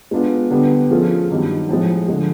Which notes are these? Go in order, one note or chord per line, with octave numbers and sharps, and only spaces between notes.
G#3 B3 D4 F4
D3 G3 B3 D4
F3 A3 C#4 F4 G#4
G2 D#3 F#3
A2 F3 G#3
D3 F3 G#3